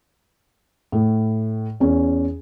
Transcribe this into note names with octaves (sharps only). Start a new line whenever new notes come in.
A2
E2 C#4